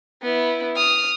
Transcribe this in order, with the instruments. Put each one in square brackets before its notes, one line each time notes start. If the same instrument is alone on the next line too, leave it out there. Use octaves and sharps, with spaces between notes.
[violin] B3 E4
D#6 F6